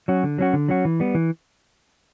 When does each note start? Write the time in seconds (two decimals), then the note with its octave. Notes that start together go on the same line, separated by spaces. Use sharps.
0.08 F#3 C#4 F#4
0.23 D3
0.38 F#3 C#4 F#4
0.53 D3
0.69 F#3 C#4 F#4
0.85 E3
1.00 G3 B3
1.15 E3